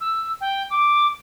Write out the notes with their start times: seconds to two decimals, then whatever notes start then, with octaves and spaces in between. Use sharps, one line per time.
0.01 E6
0.41 G5
0.70 D6